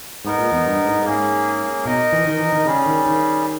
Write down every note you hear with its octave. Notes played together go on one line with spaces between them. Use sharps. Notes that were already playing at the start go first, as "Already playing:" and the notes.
G#2 B3 D#4 A#4
A#2
E2
G2
G#2
G#2 A#3 C#4 G#4
B2 D#4 A#4 D#5
E3
D#3
E3
D#3
C#3 G3 C#4 G#4
D#3
D#3